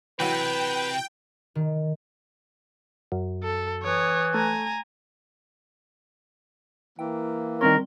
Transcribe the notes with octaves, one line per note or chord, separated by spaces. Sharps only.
C3 E3 F#3 B4 F#5 G5
D#3
F#2
A4
E3 C#5 D#6
A3 G#5 A#5
E3 A#3 G5
D#3 G3 C4 A#4 C#5 C6